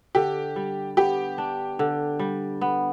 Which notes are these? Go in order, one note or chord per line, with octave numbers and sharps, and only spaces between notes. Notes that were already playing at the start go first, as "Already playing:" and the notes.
D3 G4
G3
B3 G4
D4
D3
G3
B3